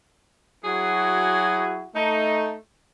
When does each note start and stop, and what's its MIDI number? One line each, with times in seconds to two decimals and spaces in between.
0.64 1.85 54
0.64 1.85 64
0.64 1.85 66
0.64 1.85 68
1.95 2.55 57
1.95 2.55 63